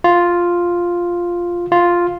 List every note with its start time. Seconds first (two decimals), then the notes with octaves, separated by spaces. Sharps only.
0.04 F4
1.72 F4